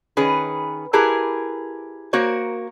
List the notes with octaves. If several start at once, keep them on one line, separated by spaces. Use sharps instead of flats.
D#3 C#4 G#4 B4
E4 G4 G#4 A#4 B4 A5
A#3 F#4 A#4 C5 C#5